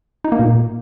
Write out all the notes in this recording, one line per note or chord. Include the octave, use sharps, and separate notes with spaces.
D#4
A#3
A#2